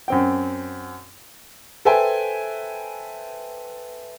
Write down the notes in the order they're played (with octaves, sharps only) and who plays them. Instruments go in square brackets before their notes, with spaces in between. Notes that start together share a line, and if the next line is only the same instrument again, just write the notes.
[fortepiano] F#2 C4 G5
[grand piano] A4 B4 C5 E5 G5 G#5